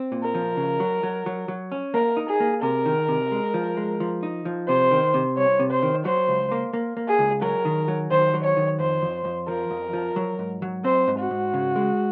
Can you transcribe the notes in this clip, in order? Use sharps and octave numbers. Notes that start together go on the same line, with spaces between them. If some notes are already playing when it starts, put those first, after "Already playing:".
Already playing: C4
A#2
A#4
F3
C#3
F#3
F#3
F#3
F#3
C#4
A#3 A#4
D#4
G#4
A#3
C3 A#4
D#3
C3
G#3
F3
G#3
F3
D#4
F3
C3 C5
D#3
C3
C2 C#5
C3
C5
D#3
F#3 C5
C#2
A#3
A#3
A#3
G#4
C#2
F#3 A#4
D#3
F#3
D#3 C5
F#3
C#5
D#3
F2 C5
F2
F2
F3 A#4
F2
F3
F#3
G#2
F#3
C4 C5
G#2
F#4
G#2
C#3
G#3